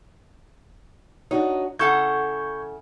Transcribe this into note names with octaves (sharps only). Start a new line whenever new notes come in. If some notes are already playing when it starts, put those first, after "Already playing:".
D4 D#4 F#4 C#5
C#3 E4 A4 F#5 C#6 G6 G#6